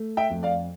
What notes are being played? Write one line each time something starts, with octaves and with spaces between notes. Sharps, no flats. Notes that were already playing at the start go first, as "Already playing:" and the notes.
Already playing: A3
E5 G5
F2
D5 F5